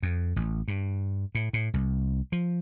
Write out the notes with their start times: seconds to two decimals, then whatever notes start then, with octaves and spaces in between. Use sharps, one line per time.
0.03 F2
0.36 A1
0.68 G2
1.35 A2
1.53 A2
1.74 C2
2.32 F3